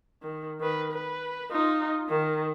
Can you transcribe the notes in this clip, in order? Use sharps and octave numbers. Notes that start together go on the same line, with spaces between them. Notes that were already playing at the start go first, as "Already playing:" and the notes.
D#3
D#3 B4
B4
D#4 F4
D#3